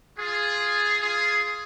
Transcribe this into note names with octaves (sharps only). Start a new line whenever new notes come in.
F4 G#4
F4 G#4